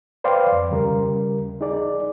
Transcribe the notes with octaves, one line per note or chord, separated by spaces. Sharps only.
B4 C5 D5 F5 G5 C6
F2
D#2 C#3 G3 A#4
D#4 G#4 D5